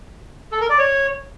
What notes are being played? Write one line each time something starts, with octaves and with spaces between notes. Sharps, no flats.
A4
A#4
D5
C#5